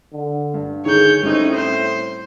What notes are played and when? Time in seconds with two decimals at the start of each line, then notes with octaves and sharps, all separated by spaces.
0.13 D3
0.54 G2
0.86 D3 D#3 G#4 C#5 G6
1.23 A2 G3 C4 C#4 D#4
1.54 C5